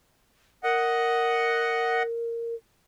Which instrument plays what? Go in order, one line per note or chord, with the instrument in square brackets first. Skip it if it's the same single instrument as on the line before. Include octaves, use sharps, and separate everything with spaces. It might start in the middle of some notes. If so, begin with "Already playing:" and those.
[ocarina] A#4 [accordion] D#5 F#5